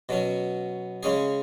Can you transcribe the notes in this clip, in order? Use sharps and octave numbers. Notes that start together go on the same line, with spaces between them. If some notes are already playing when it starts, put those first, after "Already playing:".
B2 F#3 C#4
C#3 G#3 C#4 G#4